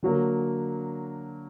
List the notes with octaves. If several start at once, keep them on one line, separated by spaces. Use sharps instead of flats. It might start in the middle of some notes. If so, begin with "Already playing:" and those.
D3 F#3 A#3